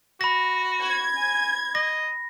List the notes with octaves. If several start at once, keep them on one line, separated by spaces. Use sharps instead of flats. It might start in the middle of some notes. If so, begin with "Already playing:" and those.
F#4 B5 A#6
G#6
G#5
D#5 A#6